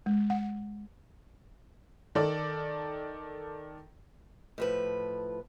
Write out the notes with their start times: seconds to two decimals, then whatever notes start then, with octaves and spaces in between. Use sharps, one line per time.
0.06 G#3
0.30 F#5
2.15 D#3 A4 D5
4.58 A2 F3 B4